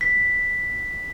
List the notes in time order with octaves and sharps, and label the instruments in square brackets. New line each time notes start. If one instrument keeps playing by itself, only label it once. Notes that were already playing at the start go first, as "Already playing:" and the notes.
[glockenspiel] B6